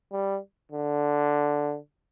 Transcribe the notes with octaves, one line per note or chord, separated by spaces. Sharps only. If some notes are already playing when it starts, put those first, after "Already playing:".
G3
D3